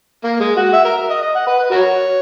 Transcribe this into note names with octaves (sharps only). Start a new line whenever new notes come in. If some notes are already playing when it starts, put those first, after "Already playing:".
A#3
G#3
F#4
E5
A#4
D#5
D#5
F#5
B4
B4
F#4 A#4 C#5